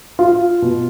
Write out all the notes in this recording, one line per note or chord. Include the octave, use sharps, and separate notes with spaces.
F4
B2